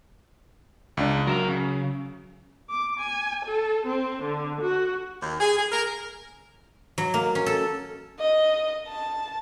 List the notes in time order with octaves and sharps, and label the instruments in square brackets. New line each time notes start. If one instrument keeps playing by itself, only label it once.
[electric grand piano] C#2 D4
[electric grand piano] F#3 [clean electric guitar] A#4 E5 F5
[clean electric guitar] C#3
[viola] D6
G#5
A4
C4
D3
F#4
[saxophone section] D#2
G#4
G#4
A#4
[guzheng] F#3
A#3
C#4
A4
[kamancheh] D#5
A5